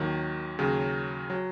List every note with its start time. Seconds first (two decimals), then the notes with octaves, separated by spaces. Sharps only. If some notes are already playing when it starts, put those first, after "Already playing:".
Already playing: D#2 D#3 F#3
0.59 D#2 C#3 F#3
1.30 F#3